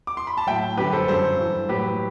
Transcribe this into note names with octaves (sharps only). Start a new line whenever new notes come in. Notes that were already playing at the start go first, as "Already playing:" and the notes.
D6
C6
B5
A5
A2 F#3 E5 G5
F#2 D3 G3 G4 B4
A4 C5
G2 D3 F#3 A4 C5
G2 E3 G3
A2 F#3 G4 B4